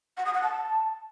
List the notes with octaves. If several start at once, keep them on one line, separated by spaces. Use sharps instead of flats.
F#5
D#6
F#5
A5